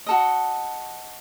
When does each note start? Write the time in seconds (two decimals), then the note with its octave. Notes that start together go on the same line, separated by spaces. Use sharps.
0.06 F#4 A4 D#5